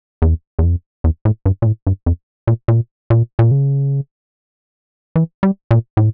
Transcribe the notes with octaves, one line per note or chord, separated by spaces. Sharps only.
E2
E2
F2
E2
A2
G2
A#2
A2
G2
F2
A#2
A#2
A#2
A#2
C#3
E3
G3
A#2
A2